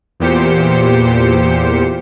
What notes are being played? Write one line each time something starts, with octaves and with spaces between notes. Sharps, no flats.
E2 A#2 G4 C5 C#7